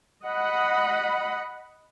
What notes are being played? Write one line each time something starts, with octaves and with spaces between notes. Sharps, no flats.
D#5 F#5 B5